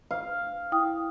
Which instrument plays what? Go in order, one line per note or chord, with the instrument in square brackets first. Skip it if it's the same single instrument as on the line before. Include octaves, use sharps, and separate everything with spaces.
[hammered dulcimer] F5
[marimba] E4 G5 D#6